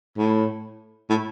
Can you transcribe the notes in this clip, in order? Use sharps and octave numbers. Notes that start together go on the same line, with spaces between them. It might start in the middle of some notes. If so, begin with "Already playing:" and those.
A2
A2